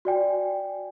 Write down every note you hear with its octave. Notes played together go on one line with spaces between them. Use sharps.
F#4 D5 G5 G#5